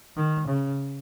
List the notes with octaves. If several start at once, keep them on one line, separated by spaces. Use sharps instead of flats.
D#3
C#3